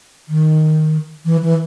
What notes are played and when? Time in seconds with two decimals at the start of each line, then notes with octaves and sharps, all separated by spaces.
0.29 D#3
1.25 E3
1.42 E3